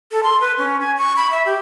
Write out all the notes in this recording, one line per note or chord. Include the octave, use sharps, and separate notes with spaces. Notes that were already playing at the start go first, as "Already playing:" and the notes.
A4
C6
B4
C#4
G#5
C#6
B5
E5
G4